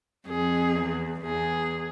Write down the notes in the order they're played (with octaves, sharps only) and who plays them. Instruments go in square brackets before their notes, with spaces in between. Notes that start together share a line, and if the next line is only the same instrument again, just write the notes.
[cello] F2 [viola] G#4
[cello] E2
[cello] E2 [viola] G#4